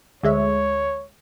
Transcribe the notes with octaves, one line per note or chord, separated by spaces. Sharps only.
D2 G#3 C#5 E5